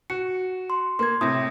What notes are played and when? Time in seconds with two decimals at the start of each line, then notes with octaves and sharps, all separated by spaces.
0.10 F#4 C#7
0.70 C6
0.99 A#3 C6 G#6
1.21 A2 C3 D#6 A#6